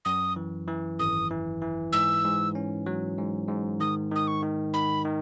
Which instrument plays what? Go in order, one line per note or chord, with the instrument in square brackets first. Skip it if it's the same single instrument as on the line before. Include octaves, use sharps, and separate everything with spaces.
[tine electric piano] F#2 [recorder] D#6
[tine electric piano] E3
E3
[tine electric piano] G#1 [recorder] D#6
[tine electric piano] E3
E3
[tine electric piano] G#2 [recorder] E6
[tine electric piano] G#2
C#4
F#3
G#2
G#2
[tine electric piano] D#3 [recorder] D#6
[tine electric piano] D#3 [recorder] D#6
[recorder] C#6
[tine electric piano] D#3
[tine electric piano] D#3 [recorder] B5
[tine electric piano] D#3